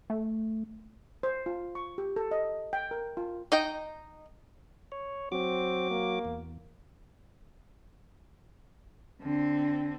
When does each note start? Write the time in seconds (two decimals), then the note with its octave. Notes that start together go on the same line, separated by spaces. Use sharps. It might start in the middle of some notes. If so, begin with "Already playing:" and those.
0.10 A3
1.23 C5
1.46 F4
1.75 C#6
1.98 G4
2.16 A4
2.31 D#5
2.73 G5
2.91 A#4
3.17 F4
3.52 D#4 D#5 G5
4.92 C#5
5.32 F#3 C4 F#4 D6
5.90 A#3
6.25 E2
9.22 D3 C4